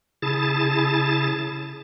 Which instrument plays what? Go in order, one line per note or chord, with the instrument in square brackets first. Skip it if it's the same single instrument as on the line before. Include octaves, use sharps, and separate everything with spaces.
[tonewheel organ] C#3 E4 G#4 A5 A6